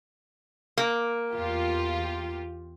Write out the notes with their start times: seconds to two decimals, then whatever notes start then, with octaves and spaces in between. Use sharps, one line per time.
0.78 A#3
1.33 E2 F4 G4